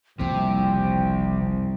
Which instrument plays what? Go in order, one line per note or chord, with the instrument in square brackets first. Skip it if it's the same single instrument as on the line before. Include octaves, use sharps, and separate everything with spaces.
[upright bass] F#1 F3 [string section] C2 [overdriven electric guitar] C3 [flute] G5